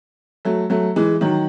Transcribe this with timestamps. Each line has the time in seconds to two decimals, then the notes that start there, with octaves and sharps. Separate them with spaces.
0.45 F#3 A3
0.70 F#3 A3
0.96 E3 G#3
1.21 D#3 F#3